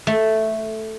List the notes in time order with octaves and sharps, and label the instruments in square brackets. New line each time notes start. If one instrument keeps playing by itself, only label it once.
[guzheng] A3